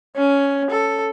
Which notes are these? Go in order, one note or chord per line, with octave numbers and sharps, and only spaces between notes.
C#4
A4